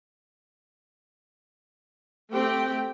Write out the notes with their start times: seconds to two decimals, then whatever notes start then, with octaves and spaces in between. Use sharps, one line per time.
2.32 A3 C4 G4 G5